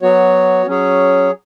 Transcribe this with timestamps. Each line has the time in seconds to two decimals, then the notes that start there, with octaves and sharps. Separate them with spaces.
0.02 F#3 B3 F#4 C#5
0.67 F#3 C#4 G#4 C#5